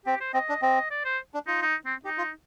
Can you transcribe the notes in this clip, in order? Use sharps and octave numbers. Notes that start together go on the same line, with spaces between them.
C4 G4
C5
C4 D#5
D4
C4 D#5
D5
C5
D4
D#4 F4
D#4
C4
D#4 G4
F4